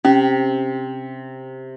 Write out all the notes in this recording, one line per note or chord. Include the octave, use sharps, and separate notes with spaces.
C3 C#4